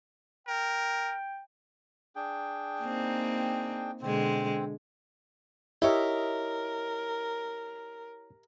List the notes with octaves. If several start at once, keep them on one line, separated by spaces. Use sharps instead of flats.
A#4 G5
D4 G#4 G5
A#3 C4 D#4
B2 D3 G#3 C4
E4 G4 A#4 C#5 D#5 E5